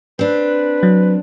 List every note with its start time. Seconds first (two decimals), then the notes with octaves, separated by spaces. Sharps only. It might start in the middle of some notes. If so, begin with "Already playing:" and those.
0.19 C4 D4 B4
0.83 F#3